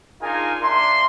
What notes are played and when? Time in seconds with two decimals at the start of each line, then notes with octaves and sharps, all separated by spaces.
0.21 D4 D#4 F4 G#4 A#4 G#5
0.62 A#3 D4 A#4 E5 C6